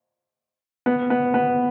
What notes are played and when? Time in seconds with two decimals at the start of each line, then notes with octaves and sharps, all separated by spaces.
0.86 B3
1.10 B3
1.34 B3